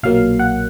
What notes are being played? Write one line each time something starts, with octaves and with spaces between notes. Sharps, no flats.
B1 A#2 F#3 A#3 F5
F#5